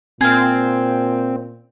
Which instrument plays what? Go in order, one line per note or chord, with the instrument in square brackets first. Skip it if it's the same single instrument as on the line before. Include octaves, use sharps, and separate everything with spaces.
[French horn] A#2 [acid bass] C4 [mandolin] G#4 F5